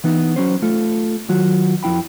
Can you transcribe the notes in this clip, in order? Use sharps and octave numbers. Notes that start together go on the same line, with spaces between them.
E3 B3 D#4
F#3 C#4 C5
A3 F4 A4
D#3 F#3 F4 F#4
F2 F3 E4 G5 B5